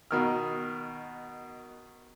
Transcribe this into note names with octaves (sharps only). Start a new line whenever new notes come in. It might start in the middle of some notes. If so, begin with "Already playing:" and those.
B2 D#3 F6